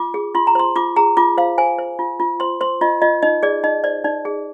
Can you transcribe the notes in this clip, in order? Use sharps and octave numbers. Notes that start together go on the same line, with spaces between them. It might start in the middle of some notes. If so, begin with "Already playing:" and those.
Already playing: F4 D6
G#4
F4 C6
A#5
C5 C6
F4 D6
G#4 A#5
F4 D6
C5 F5
C5 G#5
C5
F4
F4
C5 C6
C5 C6
F4 D#5
F4 D#5
D#4 D#5
G#4 D5
D#4 D#5
C5 D5
D#4 D5
G#4